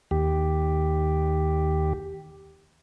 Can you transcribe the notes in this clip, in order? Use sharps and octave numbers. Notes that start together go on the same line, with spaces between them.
D#2 G4